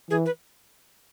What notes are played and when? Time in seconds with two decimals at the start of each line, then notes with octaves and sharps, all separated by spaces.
0.10 E3 G#4
0.25 B4